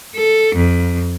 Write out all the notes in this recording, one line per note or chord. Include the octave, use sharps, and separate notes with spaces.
A4
F2